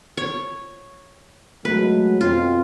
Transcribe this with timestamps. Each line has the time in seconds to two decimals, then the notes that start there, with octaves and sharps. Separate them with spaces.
0.17 C#5
1.65 F#3 G#3 A3 B4
2.21 F2 B2 C4 F4